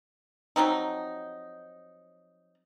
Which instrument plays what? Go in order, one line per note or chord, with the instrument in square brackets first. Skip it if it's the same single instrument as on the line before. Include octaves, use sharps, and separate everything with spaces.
[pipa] F3 F#3 C4 D#4